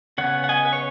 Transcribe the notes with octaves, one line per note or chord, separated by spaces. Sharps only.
C#3 B3 C#5 F#5
F#5
D#5 G#5
B4
C#5